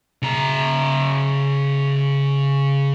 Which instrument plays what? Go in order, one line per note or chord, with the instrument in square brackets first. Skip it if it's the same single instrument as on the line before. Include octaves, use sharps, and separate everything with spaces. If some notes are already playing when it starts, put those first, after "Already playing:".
[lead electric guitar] C#3 A#5